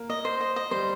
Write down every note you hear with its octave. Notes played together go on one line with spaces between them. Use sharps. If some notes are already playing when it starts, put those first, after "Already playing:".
Already playing: A#3
D#5
C5
D#5
D#5
G3 C5